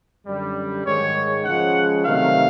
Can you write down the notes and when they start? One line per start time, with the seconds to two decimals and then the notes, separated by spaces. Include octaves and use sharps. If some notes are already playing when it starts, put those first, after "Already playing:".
0.24 F#2 D3 G3
0.84 G#2 D#3 G#3 C#5
1.44 C#3 F3 G#3 F#5
2.04 C3 D#3 F#3 A3 F5